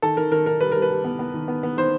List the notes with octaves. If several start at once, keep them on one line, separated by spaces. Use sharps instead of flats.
D#3 A4
D#3 A#4
D#3 A#4
D#3 A#4
G3 B4
G3 A#4
B4
G3
B3
B3
D#3
B3
B3
D#3 C5